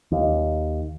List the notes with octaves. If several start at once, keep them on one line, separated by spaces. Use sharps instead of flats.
D#2